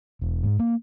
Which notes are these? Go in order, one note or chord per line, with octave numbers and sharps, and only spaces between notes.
E1
G#2
A#3